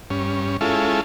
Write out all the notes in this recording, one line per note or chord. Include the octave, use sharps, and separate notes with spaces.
G2 C#4
G#3 C#4 E4 F4 A4